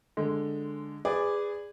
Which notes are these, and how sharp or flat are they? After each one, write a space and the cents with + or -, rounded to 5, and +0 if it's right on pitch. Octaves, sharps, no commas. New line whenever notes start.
D3 +0 G#3 +0
G#4 -15 B4 +20 D5 -5